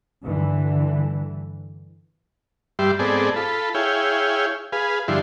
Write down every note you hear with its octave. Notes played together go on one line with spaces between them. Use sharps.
G2 D3 E3
G2 G3 E5 C6
G#2 B3 C4 G#4 A4 D5
F4 A4 B5
E4 G#4 C#5 F5 G5
G#4 B4 F5
G2 D3 F3 E4 C6